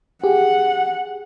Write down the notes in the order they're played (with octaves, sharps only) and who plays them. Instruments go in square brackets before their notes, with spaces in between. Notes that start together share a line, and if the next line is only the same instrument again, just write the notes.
[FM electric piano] G4 G#4 [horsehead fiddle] F#5